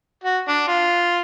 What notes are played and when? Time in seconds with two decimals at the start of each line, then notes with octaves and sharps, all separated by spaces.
0.24 F#4
0.48 D4
0.68 F4